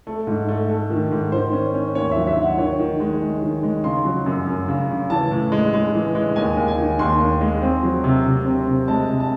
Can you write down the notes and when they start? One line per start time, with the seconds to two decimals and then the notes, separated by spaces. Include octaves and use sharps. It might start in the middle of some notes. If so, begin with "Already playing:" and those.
0.07 A3
0.27 G#2
0.49 A3
0.69 A3
0.90 D#3
1.11 G#2
1.32 D#3 C5
1.53 C#4
1.74 C#4
1.95 D#2 C#5
2.12 F#3 E5
2.27 E5
2.37 D#3
2.43 F#5
2.58 D#3 C#5
2.79 D#3
3.00 G#3
3.21 G#3
3.42 D#3
3.63 G#3
3.84 C#3 C6
4.05 F#3
4.26 F#2
4.47 F#2
4.68 C#3
4.90 C#3
5.10 E3 A5
5.31 A2
5.52 G#3
5.74 G#3
5.94 E3
6.15 G#3
6.36 D#2 G#5
6.57 D#2
6.68 G#5
6.78 D#3
6.99 D#2 C6
7.20 D#2
7.41 G#3
7.62 C4
7.83 F#3
8.04 C3
8.25 C3
8.46 C4
8.67 C3
8.88 G#3 A5
9.09 C3
9.20 A5